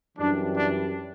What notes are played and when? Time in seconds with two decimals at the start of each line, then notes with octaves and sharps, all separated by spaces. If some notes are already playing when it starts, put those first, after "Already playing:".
0.17 F#2 E3 G3 D4
0.57 D4